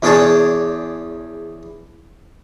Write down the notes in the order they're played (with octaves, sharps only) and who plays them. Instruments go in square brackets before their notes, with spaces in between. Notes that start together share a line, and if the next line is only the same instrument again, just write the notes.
[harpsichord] E2 C#4 D4 G#4 C#5 A5